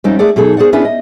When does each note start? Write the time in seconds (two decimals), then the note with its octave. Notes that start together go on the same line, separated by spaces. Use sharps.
0.04 F2 G3 C4 C#4 D#4
0.19 A3 G#4 D5 F#5
0.36 B2 F#3 D#4 G#4 A4
0.57 G#4 C5 D5 F#5
0.73 B3 C#4 D4 E4 G#4 B4
0.85 D#5